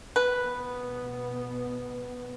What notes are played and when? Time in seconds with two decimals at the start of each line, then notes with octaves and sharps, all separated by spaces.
0.16 B4
0.45 B2 B3